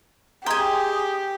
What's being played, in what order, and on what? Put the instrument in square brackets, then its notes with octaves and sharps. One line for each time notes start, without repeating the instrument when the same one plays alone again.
[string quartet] G4 [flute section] G#4 D#6 [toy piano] D#5 A#5 C6 [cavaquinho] G5 G#5